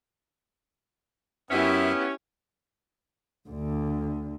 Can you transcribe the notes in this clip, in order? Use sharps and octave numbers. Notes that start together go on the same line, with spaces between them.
F#2 B3 C#4 E4 G4 E5
D2 D3